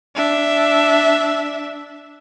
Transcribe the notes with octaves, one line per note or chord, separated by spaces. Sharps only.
D4 E5